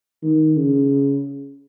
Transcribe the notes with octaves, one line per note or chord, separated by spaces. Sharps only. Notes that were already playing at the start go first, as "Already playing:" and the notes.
D#3
C#3